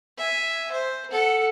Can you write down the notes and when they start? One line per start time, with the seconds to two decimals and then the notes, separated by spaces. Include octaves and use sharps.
0.18 E5 G#5
0.71 C5
1.11 A4 F#5